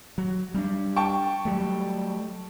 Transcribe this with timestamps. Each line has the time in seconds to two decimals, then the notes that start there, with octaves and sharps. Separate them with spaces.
0.18 F#3
0.54 G3 C4 D4
0.96 G5 A5 C#6
1.45 F#3 G3 A3